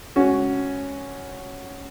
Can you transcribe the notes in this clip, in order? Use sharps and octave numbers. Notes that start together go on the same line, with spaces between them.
C#4 F#4